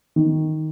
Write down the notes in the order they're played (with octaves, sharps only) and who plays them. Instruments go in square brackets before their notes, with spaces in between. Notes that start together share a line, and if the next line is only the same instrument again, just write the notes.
[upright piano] D#3